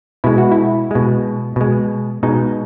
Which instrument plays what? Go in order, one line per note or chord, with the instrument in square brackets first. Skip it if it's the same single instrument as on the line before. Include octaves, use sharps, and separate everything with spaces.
[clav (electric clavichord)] B2 G#3 E4
F#4
E4
B2 G#3
B2 G#3
B2 G#3 D#4